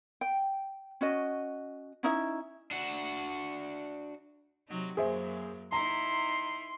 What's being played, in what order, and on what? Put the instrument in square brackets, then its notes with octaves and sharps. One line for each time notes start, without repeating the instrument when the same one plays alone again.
[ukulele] G5
C#4 F#4 D#5
C#4 D#4 E4 E5
[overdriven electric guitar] D4 F#4
[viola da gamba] C3 F#3 D#4
[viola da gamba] F#2 F#3 A#3 [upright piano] G#4 C5 E5
[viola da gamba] D#4 E4 [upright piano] A#5 [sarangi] C6